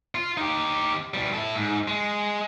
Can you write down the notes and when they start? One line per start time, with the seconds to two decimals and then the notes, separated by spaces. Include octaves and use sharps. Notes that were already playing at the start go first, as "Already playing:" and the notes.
0.15 F4
0.37 D#4 G4
1.14 B2 G3
1.33 E4 A4
1.56 G#2
1.88 G#3